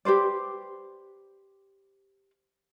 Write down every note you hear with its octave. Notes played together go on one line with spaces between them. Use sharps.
G4 B4 C5 D5